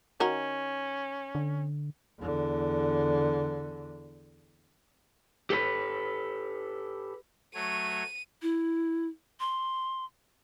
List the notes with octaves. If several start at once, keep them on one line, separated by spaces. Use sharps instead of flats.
D#3 C#4 F#4 A#4
D3
E2 D3
G4 A4 B4
F#3 A3 C#5 D#7
E4
C6